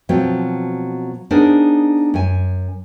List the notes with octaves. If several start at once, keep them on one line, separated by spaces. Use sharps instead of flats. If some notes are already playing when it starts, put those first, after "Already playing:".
B2 F3 F#3 C4
B3 D4 D#4 G#4 A#4 C5
F#2 G#5